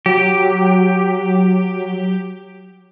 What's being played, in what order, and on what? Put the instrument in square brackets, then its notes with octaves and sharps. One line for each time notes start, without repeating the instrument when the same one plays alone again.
[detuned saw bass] F#3 [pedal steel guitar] G4